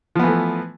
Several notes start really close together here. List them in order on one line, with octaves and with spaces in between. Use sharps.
F3 B3 E3 A3